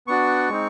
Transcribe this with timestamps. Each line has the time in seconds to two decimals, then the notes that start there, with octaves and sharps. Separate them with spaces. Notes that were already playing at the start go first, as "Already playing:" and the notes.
0.07 B3 D4 F#4 C#6
0.49 G#3 C4 D#4